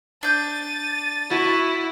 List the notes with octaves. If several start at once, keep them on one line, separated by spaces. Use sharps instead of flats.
D4 G6 A6 D#7
E4 F#4 C#6